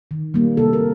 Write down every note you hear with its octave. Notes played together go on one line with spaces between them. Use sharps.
D#3
G3 A#3
C3 A4
A#4